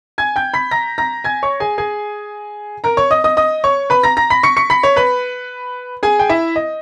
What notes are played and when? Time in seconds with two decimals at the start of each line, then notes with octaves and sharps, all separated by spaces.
0.18 G#5 G#6
0.36 G5 G6
0.54 B5 B6
0.71 A#5 A#6
0.98 A#5 A#6
1.24 G#5 G#6
1.43 C#5 C#6
1.60 G#4 G#5
1.78 G#4 G#5
2.84 A#4 A#5
2.97 C#5 C#6
3.11 D#5 D#6
3.24 D#5 D#6
3.37 D#5 D#6
3.64 C#5 C#6
3.90 B4 B5
4.03 A#5 A#6
4.17 A#5 A#6
4.30 B5 B6
4.43 C#6 C#7
4.57 C#6 C#7
4.70 B5 B6
4.83 C#5 C#6
4.96 B4 B5
6.03 G#4 G#5
6.19 G5
6.29 E4 E5
6.56 D#5